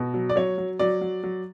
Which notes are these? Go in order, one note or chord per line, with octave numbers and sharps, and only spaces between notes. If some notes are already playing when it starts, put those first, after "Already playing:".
Already playing: B2
F#3
D5
F#3 C#5
F#3
F#3 D5
F#3
F#3